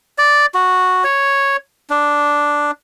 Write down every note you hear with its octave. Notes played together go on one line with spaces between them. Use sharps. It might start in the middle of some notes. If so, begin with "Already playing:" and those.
D5
F#4
C#5
D4